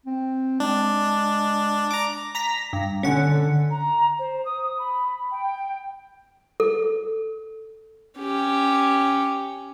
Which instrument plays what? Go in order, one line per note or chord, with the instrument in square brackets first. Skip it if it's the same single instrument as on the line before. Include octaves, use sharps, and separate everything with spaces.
[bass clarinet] C4
[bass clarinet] G#3 [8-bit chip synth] D4
[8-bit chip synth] A#5 D6
[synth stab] A#5 A#6 B6
G2
[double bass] D3 [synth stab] C#4 F#5
[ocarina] A#5
C5
D#6
B5
G5
[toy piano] A4
[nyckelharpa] C#4 G4